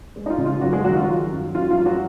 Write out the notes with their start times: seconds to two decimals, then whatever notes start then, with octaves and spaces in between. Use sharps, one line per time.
0.16 G#3
0.26 D#4
0.30 F4
0.38 C#3
0.46 F4
0.61 F#2 F#3 F#4
0.73 G#3 G#4
0.84 D#3 F#3 F#4
0.96 F4
1.08 F#3
1.31 F#2
1.55 F#3 F4
1.71 F4
1.78 F#2
1.85 F#3 F#4